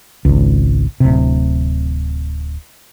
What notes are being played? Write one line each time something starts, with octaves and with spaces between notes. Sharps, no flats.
G#1 C#2
D1 C3